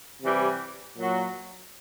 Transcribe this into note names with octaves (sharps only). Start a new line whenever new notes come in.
C3 E3 G3
A#2 F#3